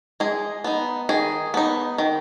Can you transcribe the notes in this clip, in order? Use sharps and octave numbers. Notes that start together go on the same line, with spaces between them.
G#3 G#4
B3 D#4
D#3 G#4
B3 D#4
D#3